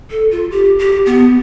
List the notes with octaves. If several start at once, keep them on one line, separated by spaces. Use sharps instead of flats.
A4
F4
G4
G4
B3